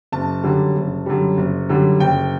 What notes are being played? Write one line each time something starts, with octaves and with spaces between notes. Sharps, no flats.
F#1 A5
F#2 D3 G3
F#1
F#2 D3 G3
F#1
F#2 D3 G3
F#1 G5